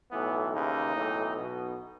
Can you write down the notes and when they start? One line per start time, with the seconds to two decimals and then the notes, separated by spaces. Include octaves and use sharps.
0.11 B1 A2 E3 B3
0.52 D#2 C#3 E3 D#4
0.94 B1 A2 E3
1.36 B1 B2